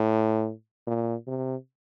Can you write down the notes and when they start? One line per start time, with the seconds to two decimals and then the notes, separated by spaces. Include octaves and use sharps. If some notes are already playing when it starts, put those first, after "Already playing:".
Already playing: A2
0.87 A#2
1.28 C3